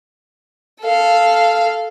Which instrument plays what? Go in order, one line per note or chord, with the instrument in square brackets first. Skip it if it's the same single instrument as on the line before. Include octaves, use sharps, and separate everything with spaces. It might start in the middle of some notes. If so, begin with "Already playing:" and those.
[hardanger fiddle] A4 F5